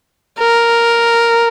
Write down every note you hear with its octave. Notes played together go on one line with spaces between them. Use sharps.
A#4